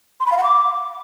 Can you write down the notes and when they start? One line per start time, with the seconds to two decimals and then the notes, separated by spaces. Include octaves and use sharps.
0.20 C6
0.26 B5
0.32 F5
0.38 F#5
0.43 D6